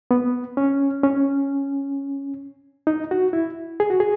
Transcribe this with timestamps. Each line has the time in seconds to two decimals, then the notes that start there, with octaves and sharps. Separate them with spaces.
0.11 B3
0.57 C#4
1.03 C#4
2.87 D#4
3.11 F#4
3.33 E4
3.80 G#4
3.90 F#4
4.00 G#4